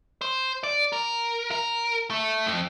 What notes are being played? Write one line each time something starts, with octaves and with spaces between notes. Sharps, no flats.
C5
D5
A#4
A#4
A3
F2